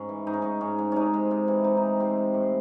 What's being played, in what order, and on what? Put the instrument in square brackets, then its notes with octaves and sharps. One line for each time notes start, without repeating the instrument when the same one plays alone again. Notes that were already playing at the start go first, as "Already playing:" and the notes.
Already playing: [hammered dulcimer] G#2 C#4
E3
G#2 D#4
C#4
G#2 D#4
G#2 C#4
G#2
C3 C#4 D#4
G#3
C3
E3
C3 D#4
D#4
C3
C3 C4
G#3
A2